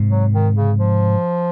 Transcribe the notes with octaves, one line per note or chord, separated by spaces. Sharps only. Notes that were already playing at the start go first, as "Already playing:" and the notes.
Already playing: G#2 C3
F#3
D#3
C#3
F3